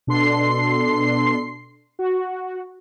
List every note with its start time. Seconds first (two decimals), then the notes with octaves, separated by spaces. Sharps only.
0.07 B2 D4 A4 C6 C7
1.99 F#4